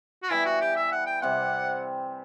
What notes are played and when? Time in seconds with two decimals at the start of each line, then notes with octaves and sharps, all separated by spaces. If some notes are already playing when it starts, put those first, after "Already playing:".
0.23 F#4
0.30 E3 G3 B3 E4
0.45 F#4
0.61 G4
0.76 E5
0.92 F#5
1.06 G5
1.22 C3 G3 C4 F#5